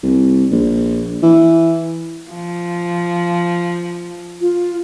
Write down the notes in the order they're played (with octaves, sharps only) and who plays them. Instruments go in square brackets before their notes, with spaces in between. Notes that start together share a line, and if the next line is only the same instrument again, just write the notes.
[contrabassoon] C2
A#1
E3
[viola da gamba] F3
[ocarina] F4